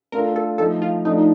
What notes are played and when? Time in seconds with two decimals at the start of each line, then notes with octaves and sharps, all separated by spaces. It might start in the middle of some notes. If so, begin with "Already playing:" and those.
0.12 A3 D4 F4 A4 A#4
0.36 A4
0.58 F3 A3 D#4 A4
0.82 F4
1.05 F3 A3 D4 D#4